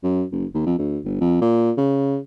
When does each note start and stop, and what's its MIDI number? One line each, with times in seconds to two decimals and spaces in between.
0.04 0.25 42
0.32 0.46 30
0.54 0.64 39
0.66 0.75 41
0.78 0.99 38
1.04 1.18 31
1.20 1.41 41
1.41 1.72 46
1.78 2.18 49